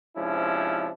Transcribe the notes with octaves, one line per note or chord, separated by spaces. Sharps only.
G#2 C3 F3 C#4 D4 E4